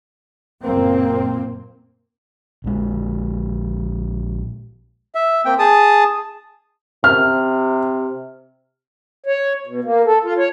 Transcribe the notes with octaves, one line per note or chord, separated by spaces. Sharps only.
F#1 A#2 A#3 C4
A#1 G#3
E5
A#3 C4 G5
G#4 A5 D#6
C3 F6
C#5
B2
A#3
A4
F4
C#5